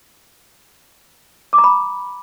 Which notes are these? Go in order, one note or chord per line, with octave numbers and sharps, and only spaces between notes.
D6
A#5
B5